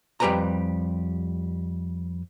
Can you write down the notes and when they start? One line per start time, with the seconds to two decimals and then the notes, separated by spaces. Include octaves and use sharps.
0.20 F2 G3 G4 B4 G#5 A#5